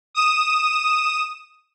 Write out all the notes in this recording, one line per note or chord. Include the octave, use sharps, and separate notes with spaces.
D#6 E7